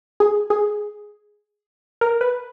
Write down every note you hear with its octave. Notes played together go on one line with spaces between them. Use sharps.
G#4
G#4
A#4
B4